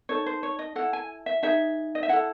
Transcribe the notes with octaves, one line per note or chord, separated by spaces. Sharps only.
D#4 A4 C#5
C5
C#5
D#5
E4 A4 F#5
G#5
E5
D#4 G#4 E5
D#5
E5
E4 A4 F#5